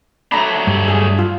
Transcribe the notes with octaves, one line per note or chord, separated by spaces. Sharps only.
F#3 A3 D4 A#5 B5
G2
G#4
F4